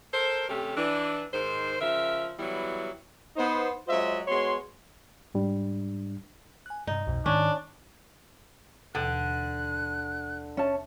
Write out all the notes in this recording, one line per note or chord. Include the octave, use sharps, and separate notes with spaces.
A4 A#4 C5
C3 A3 C#4 G4
E3 D4
G#2 D#3 C5
C#3 F3 A#4 E5
E3 F#3 G3 B3 E4
B3 D#4 C5
F#3 G#3 F4 C5 D#5 E5
G#3 B3 F#4 C#5 C6
G#2 G3 D4
G#5 F#6
G2 C3 D#4
B1 F2 B2
G#2 D#3 C#4 D4
D#2 B2 D3 E3 F#6
C#4 E5 A5